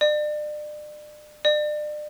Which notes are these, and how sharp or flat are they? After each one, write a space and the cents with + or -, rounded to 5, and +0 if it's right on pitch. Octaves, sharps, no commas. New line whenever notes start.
D5 +35
D5 +35